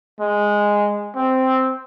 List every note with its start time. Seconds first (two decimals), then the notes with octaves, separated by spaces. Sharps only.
0.21 G#3
1.16 C4